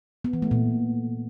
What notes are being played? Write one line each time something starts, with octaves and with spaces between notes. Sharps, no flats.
B3
E3
A3
A#2